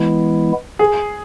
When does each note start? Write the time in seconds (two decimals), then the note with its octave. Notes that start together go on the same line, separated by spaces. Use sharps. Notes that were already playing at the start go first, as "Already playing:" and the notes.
Already playing: E3 G#3 B3 E4
0.79 G#4